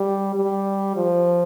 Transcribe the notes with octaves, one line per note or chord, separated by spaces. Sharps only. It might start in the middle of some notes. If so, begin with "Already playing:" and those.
Already playing: G3
G3
F3